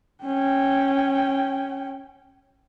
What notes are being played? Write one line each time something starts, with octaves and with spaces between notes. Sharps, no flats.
C#4 G5